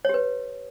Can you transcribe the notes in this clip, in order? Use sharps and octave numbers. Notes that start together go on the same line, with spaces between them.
G4 B4 C#5